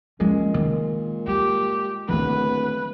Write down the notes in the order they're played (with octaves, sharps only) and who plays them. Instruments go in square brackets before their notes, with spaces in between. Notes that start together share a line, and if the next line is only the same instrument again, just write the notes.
[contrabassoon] A#2 [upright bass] F3 C#4 [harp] G#3
[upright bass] D#3
[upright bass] G3 [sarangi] G4
[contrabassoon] D1 [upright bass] D#3 B3 [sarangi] B4